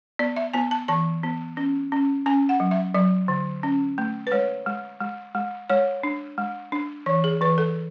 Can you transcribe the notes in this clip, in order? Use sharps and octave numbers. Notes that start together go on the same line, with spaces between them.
B3 D5
E5
B3 G#5
A5
E3 A5
B3
C#4
C#4
C#4 G#5
F#5
F#3
E5
F#3 D5
D3
C#4
A3
B4
G#3 C#5
G#3
G#3
G#3
G#3 C#5
D4
G#3
D4
E3 C#5
G#4
E3 B4
A4